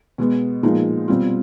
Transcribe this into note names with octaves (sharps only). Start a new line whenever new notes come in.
B2 G#3 B3
A#2 F3 G#3 B3 D#4
B2 G3 C4 F4